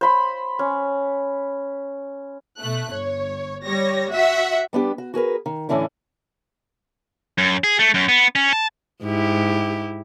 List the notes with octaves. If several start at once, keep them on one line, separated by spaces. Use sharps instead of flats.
C5 B5 C6
C#4
B2 A3 F#6
G1 C#5
G3 C#5 A#6
F#4 E5 F#5
G3 B3 D4 G4
F#4
F#4 G#4 A#4 B4
D#3
A2 D3 E3 C#4 D4 E4
F#2
G#4
A3
F#2
B3
C#4
A5
G#2 E4 G4